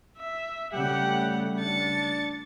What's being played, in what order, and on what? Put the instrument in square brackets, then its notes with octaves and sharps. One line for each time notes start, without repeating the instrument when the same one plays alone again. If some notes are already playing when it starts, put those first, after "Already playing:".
[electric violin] E5
[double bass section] C#3 G3 A3 [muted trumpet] G4 [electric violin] F#5
[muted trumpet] D4 [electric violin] A6 C#7